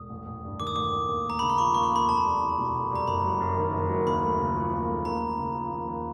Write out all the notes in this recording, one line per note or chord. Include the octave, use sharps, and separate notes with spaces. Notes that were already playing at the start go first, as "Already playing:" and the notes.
Already playing: E1 D#6
A1
A1
G2
D#3 D6
D#6
A1 D6
A1
D#2
A#3 A#5
C#3 B5
C6
F3 C#6
D#2 C#6
C6
A#3 B5
F1 A5
G3
E2
B2
F1
G3 A#5
F#1 B5
F#3
F#2
D#3
F#1
F#3
D#2 B5
A3
C#3
F3
D#2
A3
D#2 A#5
D#2
C#3
F3
D#2
D#2